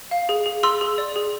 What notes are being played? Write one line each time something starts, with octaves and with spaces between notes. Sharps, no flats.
F5
G#4
G#4
G#4 C6 E6
G#4
D5
G#4